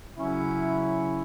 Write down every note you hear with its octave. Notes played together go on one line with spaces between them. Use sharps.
C#3 F#3 C#4 E4